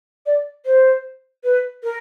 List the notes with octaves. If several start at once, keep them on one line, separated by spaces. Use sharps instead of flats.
D5
C5
B4
A#4